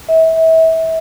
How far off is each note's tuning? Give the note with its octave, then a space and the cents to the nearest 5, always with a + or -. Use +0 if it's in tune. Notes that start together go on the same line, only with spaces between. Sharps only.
E5 -30